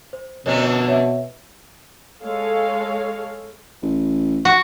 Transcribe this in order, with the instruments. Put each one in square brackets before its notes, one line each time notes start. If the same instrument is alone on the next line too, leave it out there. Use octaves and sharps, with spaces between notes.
[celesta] C5
[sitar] F2 D3 A3 [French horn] B2 [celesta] A#4 C#5 D#5
[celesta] C#5 E5
[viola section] G#3 A4 C#5 F5
[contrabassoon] A1
[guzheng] F#4